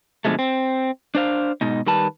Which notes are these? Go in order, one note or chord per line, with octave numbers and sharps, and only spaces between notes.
B2 D3 F3 G#3 A3
C4
D4 C5 F5
G#2 B2 D#4
D#3 G3 B4 A5